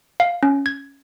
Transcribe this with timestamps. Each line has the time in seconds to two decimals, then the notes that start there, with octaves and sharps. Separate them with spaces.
0.20 F5
0.43 C#4
0.66 G#6